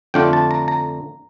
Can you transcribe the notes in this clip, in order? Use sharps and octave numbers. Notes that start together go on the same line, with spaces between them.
F2 D3 A3 D4 F4 G5
A5
A#5
A#5